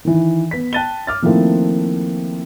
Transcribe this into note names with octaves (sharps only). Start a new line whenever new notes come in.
D#3 E3
B3 B6
G5 A5 F#6 A6 D#7 G7
D6 F6 A6
D#3 F3 A3 A#3 C4 E4